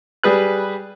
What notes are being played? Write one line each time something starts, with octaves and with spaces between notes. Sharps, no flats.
G3 G#4 B4 F#6